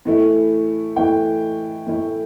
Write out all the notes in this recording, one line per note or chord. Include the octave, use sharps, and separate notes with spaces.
A2 E3 A3 E4
A2 E3 A3 E4 G5
A2 E3 A3 E4